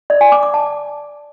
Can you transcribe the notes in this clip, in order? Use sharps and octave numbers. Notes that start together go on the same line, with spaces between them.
D5
G#5
D6
D6
A5